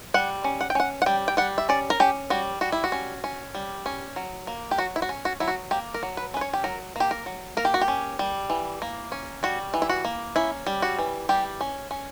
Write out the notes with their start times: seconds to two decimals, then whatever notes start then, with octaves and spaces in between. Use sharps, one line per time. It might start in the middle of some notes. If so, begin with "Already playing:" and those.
0.14 G3 F#5
0.44 C#4
0.61 F#5
0.70 G5
0.75 C#4 F#5
1.02 F#5
1.06 G3 G5
1.28 G5
1.37 G3 F#5
1.58 E5
1.69 C#4 D5
1.90 A#4
2.00 C#4 G4
2.30 G3 F#4
2.61 G3 F#4
2.72 E4
2.84 F#4
2.92 C#4
3.24 C#4
3.54 G3
3.86 C#4
4.16 F#3
4.47 A#3
4.71 G4
4.78 F#3 F#4
4.96 E4
5.02 F#4
5.09 C#4
5.25 F#4
5.40 F#3 E4
5.48 F#4
5.71 A#3 G4
5.94 A#4
6.03 F#3
6.17 B4
6.34 C#4 B4
6.41 C#5
6.53 G4
6.64 F#3 A#4
6.96 A#3 G4
7.11 A#4
7.26 F#3
7.57 A#3 A#4
7.65 G4
7.74 F#4
7.81 G4
7.88 C#4
8.19 G3
8.50 E3
8.82 A#3
9.12 C#4
9.43 G3 F#4
9.74 E3
9.82 E4
9.89 F#4
10.05 A#3
10.36 C#4 E4
10.66 G3
10.82 F#4
10.98 E3
11.29 G3 G4
11.61 C#4
11.91 C#4